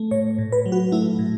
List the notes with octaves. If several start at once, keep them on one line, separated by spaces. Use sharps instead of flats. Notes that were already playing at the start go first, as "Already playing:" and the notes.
Already playing: A3
A2 C#5
A2
B4
F#3
F#4
A3 E4
A2